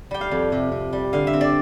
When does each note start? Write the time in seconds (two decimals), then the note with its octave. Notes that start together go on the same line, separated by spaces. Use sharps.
0.11 G3 G5
0.21 F5
0.31 F2
0.52 C3
0.72 C3
0.93 G3
1.13 D3 F5
1.27 E5
1.33 C4
1.41 D5